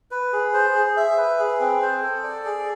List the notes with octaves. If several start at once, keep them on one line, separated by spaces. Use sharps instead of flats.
B4
G#4
C5
G#4
E5
B4
G#4
C4
C5
A4
D5
G#4